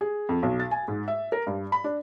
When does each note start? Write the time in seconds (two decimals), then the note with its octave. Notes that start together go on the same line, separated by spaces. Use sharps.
0.01 G#4
0.29 F2
0.43 B1
0.60 A6
0.71 G#5
0.88 G#2
1.08 E5
1.32 A#4
1.47 G2
1.72 B5
1.84 D4